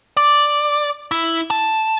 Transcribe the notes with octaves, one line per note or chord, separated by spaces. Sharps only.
D5
E4
A5